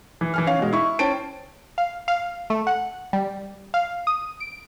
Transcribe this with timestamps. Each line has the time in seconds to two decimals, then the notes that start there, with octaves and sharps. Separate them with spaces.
0.21 E3
0.34 E3 G#5 F6
0.47 C#4 F5
0.59 B2 G#3
0.73 E4 C#6
0.99 C#4 C5 G5 A5 D7
1.78 F5
2.08 F5
2.50 A3
2.67 F#5
3.13 G3
3.74 F5
4.07 D#6
4.40 D7